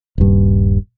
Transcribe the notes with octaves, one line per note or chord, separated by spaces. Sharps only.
D#1 G2